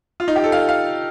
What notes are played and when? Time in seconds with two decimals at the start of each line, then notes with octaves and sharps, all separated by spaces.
0.20 F4
0.28 D#4
0.36 G4
0.44 A4
0.52 F5
0.69 F5